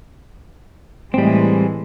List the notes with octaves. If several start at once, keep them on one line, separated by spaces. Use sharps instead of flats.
A2 E3 G3 G#3 C4